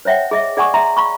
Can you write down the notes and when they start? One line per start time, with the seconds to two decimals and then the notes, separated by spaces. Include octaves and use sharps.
0.05 C5 C#5 E5 F#5 G5
0.31 G#4 D#5 E5
0.57 G#4 D5 F#5 G#5 C#6 D#6
0.74 E5 A#5 C6
0.97 F5 B5 C#6